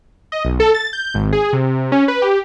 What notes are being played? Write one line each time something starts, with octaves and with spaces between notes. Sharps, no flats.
D#5
B1
A4
A6
G6
G#1
G#4
C3
C#4
B4
G4